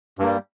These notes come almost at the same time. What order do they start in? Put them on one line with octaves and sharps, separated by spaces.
G2 A#3 G3